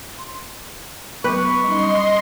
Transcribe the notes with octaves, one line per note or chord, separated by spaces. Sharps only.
C6
F#3 B3 B4 C#6 D6
G3 C#4 D#4 D#5 C6